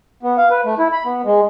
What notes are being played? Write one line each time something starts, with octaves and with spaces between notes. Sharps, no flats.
B3
F5
B4
A3
E4
B5
B3
G#3